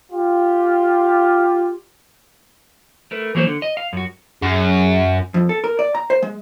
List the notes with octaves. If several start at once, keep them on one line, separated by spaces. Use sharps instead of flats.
F4 G4
A3 A#4 B4
E3 F#3 A#3 A#4 C5
D3
D#5
F5
F#2 F#4
F#2 G#4
F2
A4
A#4
D5
A#5
C5
G#3